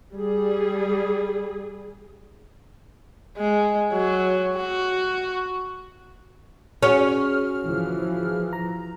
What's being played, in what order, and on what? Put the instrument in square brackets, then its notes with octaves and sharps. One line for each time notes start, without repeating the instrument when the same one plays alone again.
[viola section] G3 G#4
[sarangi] G#3
F#3
F#4
[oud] C#4 [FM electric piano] F#4 G#4 F6
[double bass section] E3 F3
[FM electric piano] A#5